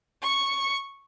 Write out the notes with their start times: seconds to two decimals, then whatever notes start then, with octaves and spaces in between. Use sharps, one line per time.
0.22 C#6 C#7